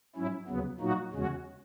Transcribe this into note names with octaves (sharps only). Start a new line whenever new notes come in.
G#2 F#3 C#4 E4
D#2 C#3 F#3 B3
A#2 F#3 A#3 D#4 F#4
E2 C#3 G#3 C#4 F#4